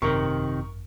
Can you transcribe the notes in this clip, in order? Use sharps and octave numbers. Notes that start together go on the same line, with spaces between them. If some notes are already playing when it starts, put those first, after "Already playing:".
G#1 F#2 C3 D#3 A#4 C#6